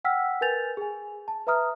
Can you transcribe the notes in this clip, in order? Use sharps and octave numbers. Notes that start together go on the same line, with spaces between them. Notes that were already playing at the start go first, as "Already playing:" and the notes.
F#5 G5 E6 F6 B6
A#4 B4 G#5 G6 A6 F7
G#4 G#5
A5
B4 E5 A#5 D#6 F6